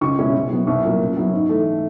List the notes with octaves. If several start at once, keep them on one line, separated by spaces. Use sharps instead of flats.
C#2 C#6
B2 G#3 C#4 E4
C2
B2 F#3 B3
C2 C#6
A#2 F#3 A#3
C#3
F#3 B3 E4
G#2
E3 A3